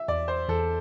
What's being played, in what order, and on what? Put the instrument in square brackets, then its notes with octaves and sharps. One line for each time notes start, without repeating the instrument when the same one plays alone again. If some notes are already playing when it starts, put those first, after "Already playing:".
Already playing: [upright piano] E5
[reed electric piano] E2 [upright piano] D5
[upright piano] C5
[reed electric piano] E2 [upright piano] A4